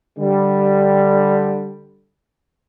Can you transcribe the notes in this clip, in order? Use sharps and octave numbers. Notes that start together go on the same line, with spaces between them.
D3 G3